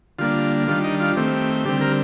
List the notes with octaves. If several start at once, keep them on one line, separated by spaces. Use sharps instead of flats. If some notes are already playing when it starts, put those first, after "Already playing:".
D3 G3 A#3 D4 F4
D#3 G3 D4 F4
D#4
F4
D#3 A3 C4 G4
D3 G3 C4 G4
A#4